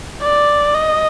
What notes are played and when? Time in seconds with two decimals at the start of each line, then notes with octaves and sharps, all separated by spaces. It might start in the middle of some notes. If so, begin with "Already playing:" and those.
0.22 D5
0.75 D#5